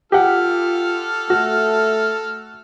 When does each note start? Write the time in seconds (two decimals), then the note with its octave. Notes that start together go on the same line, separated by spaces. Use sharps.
0.12 F4 G4 A4 F#5 F6
1.30 A3 F#4